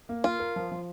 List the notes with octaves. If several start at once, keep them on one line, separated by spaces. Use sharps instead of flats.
A#3
F4 A#4
A#4
F3
F3